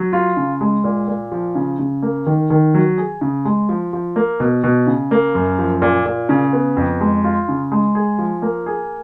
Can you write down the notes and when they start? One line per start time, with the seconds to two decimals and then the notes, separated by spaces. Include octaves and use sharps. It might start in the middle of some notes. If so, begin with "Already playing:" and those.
Already playing: F#3
0.13 F4
0.37 C#3
0.61 G#3
0.84 A#2
1.08 A#2
1.32 F3
1.55 C#3
1.79 C#3
2.02 A#3
2.27 D#3
2.50 D#3
2.74 F#3
2.98 G#4
3.21 C#3
3.45 G#3
3.69 F3
3.93 F3
4.16 A#3
4.40 B2
4.64 B2
4.87 C#3
5.11 A#3
5.35 F#2
5.58 F3
5.82 A#2
6.06 A#2
6.29 C#3
6.53 B3
6.77 F2
7.01 G#3
7.24 F4
7.48 C#3
7.72 G#3
7.95 G#4
8.18 F3
8.42 A#3
8.66 G#4